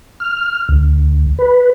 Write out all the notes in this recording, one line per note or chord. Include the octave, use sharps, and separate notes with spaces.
F6
D2
B4